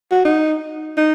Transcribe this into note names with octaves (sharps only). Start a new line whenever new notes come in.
F#4
D#4
D#4